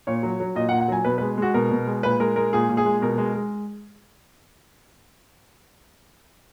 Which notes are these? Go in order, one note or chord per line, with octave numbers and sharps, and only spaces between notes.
A#2 C#5
F#3
F#3
A#2 D#5
F#5
A#2
F#5
F#3 G#5
B2 B4
B4
G#3
G#3 F#4
B2 A#4
B2
G#3
A#2 B4
G#3 A#4
G#3 A#4
A#2 G#4
A#2
G#4
G#3
B2 A#4
G#3
G#3